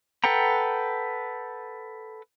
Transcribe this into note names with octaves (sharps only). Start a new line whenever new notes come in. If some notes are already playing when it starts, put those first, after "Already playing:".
A4 B4 F#5 G5 A#5